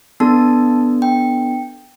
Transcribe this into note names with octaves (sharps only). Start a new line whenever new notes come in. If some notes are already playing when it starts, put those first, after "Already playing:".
B3 D4 A4 A5
G5